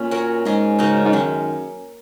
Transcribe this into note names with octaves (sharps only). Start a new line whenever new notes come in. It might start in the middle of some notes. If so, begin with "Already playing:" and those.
Already playing: A#2 C#4
A#3 F#4 A#4 C#5
G#2 C#4 G#4 D#5
C#3 A#3 D#4 F#4
G#2
F#2 D#3 G#3 C#4